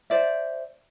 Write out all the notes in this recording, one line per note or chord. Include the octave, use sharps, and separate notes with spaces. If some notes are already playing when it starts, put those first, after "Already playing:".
C5 D5 E5